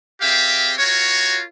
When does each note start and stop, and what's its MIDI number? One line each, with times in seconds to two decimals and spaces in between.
0.21 0.73 60
0.21 0.73 67
0.21 0.73 68
0.21 0.73 76
0.21 0.73 77
0.21 0.73 79
0.78 1.40 65
0.78 1.40 66
0.78 1.40 70
0.78 1.40 73